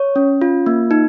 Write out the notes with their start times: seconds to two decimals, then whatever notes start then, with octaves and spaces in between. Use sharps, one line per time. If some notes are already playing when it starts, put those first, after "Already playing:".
Already playing: C#5
0.16 C#4
0.41 F4
0.66 A#3
0.91 D#4